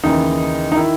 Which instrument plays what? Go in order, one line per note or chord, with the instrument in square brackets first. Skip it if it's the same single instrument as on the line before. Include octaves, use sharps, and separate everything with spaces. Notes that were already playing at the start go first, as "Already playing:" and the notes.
[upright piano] D#2 C#3 E3 D#4
D#4
D#3 E4